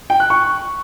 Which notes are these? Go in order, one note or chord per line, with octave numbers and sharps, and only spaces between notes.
G5
F#6
C#6